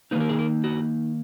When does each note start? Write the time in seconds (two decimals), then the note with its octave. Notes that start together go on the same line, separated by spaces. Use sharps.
0.11 D#3 A#3 D#4 B4
0.20 A#4
0.29 G#4
0.39 A#4
0.64 F#4